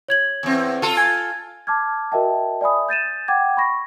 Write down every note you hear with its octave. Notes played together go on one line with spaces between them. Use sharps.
C#5 G#6 F#7
E2 C4
F4 A4
G#5 G#6
A5 D6 F6 G#6
F#4 A#4 D#5 E5 G5 A5
D5 E5 G#5 B5 D#6
G6 A6 D#7 E7
F#5 G5 D6 G#6
B5 C#6 A#6